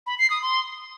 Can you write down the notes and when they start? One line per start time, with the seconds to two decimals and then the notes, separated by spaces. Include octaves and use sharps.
0.07 B5
0.18 C7
0.30 D#6
0.42 C6